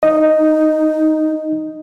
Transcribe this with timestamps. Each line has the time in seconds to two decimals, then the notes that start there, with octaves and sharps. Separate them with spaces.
0.03 D#4 D#5